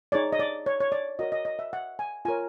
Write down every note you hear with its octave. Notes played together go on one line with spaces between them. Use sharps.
D#4 G#4 C#5 D5
D#5
D5
C#5
C#5
D5
F#4 A#4 C#5 D#5
D#5
D#5
E5
F#5
G#5
F4 A#4 C#5 G#5